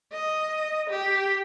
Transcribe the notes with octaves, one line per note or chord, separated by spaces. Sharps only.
D#5
G4